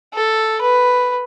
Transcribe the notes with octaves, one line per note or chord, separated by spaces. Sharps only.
A4
B4